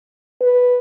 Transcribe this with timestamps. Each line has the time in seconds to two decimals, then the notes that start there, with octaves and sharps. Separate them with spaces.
0.42 B4